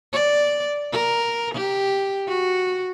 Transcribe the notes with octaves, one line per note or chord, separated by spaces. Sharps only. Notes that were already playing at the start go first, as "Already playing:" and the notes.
D5
A#4
G4
F#4